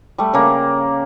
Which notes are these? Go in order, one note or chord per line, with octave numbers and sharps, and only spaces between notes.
G3 A3
C#3 A#3